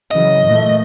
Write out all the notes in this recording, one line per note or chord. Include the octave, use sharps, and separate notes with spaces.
C#3 E3 F#3 D#5
A#2 E3 A3